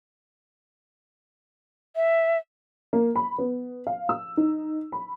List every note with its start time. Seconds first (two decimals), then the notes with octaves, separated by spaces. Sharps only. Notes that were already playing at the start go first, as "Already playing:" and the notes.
1.96 E5
2.93 A#3
3.16 B5
3.38 B3
3.87 F5
4.09 E6
4.37 D#4
4.92 B5